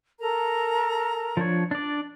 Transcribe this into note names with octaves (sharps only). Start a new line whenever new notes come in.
A4 A#4 A#5
F3 D4 C#5
D4 D5